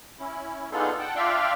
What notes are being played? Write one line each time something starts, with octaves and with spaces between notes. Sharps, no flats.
C#4 E4
B3 D4 D#4 F4 G#4 A4
F#5 G5 A5
D4 F4 D5 E5 F5 G5